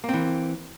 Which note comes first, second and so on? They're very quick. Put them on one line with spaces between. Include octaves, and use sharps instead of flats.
A#3 C4 E3